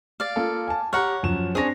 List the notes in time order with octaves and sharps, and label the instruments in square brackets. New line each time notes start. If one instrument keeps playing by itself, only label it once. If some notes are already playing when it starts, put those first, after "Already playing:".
[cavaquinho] D5 F5
[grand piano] A#3 F4 A4
G#5 A5
[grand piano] G4 A#5 F6 [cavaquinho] C#5 F#5
[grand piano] F#2 F3 E7
[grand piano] C4 D4 A#6 [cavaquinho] G#4 C#5